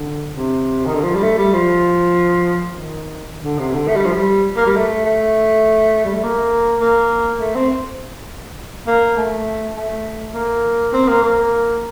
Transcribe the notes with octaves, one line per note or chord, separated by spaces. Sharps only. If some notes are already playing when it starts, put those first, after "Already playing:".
Already playing: D3
C3
D#3
D3
F3
G3
A3
G3
F3
D#3
D3
C3
D3
A3
G3
F3
G3
A#3
G3
A3
A3
G3
A3
A#3
A#3
A3
C4
A#3
A3
A3
A#3
C4
A#3
A#3